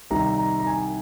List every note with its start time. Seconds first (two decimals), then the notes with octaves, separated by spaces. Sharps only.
0.11 C2 C3 D#3 A#5
0.38 A#5
0.60 A#5
0.67 G#5